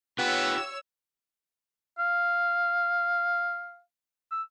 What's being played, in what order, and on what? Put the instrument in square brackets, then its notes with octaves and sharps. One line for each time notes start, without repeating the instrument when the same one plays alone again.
[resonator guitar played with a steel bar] B3 [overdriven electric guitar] F4 G4 [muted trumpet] B4 [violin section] C#5 E6
[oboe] F5
E6